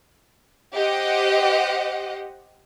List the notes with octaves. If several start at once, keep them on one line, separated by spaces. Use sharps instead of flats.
G4 C5 D#5 F#5